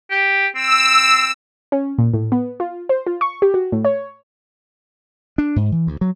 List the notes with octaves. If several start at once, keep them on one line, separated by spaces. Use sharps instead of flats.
G4
C4 E6
C#4
A#2
A2
B3
F4
C5
F4
C#6
G4
F#4
A2
C#5
D4
G#2
E3
D2
F#3